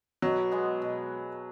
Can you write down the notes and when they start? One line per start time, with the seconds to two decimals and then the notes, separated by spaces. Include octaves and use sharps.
0.22 B2 F#3
0.52 G#3 B3 F#4
0.82 B2